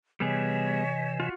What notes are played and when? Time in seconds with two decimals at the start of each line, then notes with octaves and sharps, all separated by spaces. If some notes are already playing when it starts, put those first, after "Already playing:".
0.20 C3 E3 G3 B3 G#4 C#5 D#5 G#5
1.20 F4 F#4